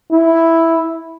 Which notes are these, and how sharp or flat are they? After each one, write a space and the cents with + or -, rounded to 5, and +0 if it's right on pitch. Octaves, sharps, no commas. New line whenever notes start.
E4 -5